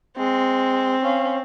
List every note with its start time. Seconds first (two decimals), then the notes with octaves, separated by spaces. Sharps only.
0.17 G#3 C4
1.02 C#4 F5